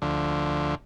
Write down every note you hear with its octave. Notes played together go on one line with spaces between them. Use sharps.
D2 D3 F3